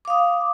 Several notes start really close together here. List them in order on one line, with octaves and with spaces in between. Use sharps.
D6 F5 D#6